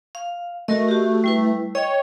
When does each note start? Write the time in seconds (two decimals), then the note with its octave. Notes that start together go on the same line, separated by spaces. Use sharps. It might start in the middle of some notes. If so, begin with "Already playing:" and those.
0.15 F5
0.68 A3 F#4 A#4 D#5
0.89 F#4 G4
1.24 G3 E4 B4
1.75 C#5 D#5 G5